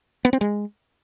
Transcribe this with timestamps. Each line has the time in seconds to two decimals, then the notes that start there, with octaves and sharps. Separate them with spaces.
0.25 B3
0.33 C4
0.41 G#3